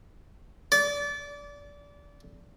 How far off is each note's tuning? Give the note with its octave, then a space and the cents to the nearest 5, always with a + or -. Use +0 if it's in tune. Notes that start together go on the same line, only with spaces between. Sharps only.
D5 -25